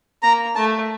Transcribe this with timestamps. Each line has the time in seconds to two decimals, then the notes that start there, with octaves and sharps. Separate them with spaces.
0.23 A#3 A#5
0.55 A3 A5